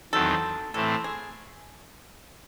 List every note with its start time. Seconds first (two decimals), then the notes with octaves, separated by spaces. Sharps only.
0.13 E2 D#3 F#3 C4 A4
0.73 A2 E3 A3 C4 A4
1.04 G#4